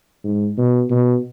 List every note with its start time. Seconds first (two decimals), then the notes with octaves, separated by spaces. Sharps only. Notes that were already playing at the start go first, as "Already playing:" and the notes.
0.24 G#2
0.58 B2
0.91 B2